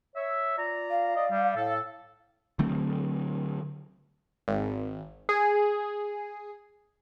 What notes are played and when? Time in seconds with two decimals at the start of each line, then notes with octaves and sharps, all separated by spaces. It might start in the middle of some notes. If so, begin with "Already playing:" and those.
0.16 C#5 E5
0.57 F4 D5 A#5
0.91 F5
1.16 D5 D#5
1.30 G3
1.56 A2 A4
2.59 D3 F#3 A3 C4
4.48 G#1
5.29 G#4